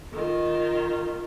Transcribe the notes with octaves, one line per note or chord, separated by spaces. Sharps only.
D#3 F4